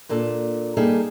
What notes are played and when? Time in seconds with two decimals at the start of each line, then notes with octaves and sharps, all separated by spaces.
0.09 A#2 A#3 D4 A4
0.77 G3 A#3 D#4 G#4 A4